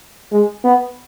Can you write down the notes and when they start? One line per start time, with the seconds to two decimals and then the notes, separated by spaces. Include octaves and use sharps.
0.32 G#3
0.64 B3